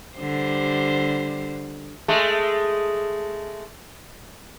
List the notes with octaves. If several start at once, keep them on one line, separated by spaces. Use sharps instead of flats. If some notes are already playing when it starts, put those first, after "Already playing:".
D3 G3 C5
G#3 A3